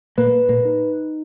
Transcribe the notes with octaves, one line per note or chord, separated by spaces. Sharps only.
A#2 A#3 B4
A#2 A#3
D#4